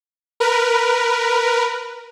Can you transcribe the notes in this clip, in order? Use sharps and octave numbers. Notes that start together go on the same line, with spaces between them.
A#4 B4